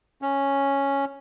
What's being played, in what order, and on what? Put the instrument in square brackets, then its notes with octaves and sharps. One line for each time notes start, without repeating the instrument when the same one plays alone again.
[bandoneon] C#4